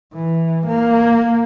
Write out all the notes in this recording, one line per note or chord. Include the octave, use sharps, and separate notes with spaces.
E3
A#3